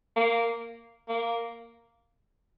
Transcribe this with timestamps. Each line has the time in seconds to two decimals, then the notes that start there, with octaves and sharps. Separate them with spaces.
0.16 A#3
1.09 A#3